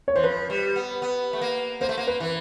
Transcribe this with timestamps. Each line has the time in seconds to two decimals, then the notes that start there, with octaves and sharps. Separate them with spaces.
0.08 C#5
0.16 E3 C5
0.23 F3 B4
0.50 G3
0.76 B3
1.02 B3
1.33 A3
1.41 A#3
1.81 A#3 C5
1.89 A3
1.98 A#3
2.07 B4
2.20 E3